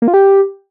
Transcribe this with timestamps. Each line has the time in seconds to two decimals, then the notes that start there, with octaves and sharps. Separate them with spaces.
0.02 A#3
0.08 F4
0.14 G4